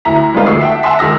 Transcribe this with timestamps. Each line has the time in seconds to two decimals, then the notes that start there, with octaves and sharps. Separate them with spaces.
0.05 D2 E4 A#5 B6
0.35 G3 G#3 A#3 D#4 F4 B4
0.46 D2 A3 C#6 E6 C7
0.61 E5 F#5 G5 A5
0.83 E5 F#5 G#5 A5 C6 B6
0.99 C#2 D#3 G#4 E6 A#6